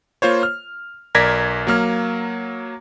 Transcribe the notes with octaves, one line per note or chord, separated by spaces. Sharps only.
A#3 F4 C5 C#5
F6
B1 A#4 D5 G#6 A#6 B6
F#3 A#3 F6